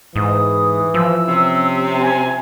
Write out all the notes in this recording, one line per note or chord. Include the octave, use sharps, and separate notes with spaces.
G#2 E3 D#6
F3 E6
C3 C#4
G#5